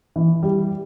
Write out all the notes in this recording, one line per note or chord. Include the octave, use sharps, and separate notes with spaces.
E3
G3